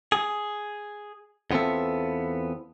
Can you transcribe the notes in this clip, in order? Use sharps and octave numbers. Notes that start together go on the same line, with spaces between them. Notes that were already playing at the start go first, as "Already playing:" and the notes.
G#4
E2 B3 C4 F4 A4 E5